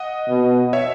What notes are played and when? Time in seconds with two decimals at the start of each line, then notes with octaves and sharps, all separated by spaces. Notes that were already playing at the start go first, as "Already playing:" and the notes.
Already playing: D#5 F#5
0.29 B2
0.73 C#5 E5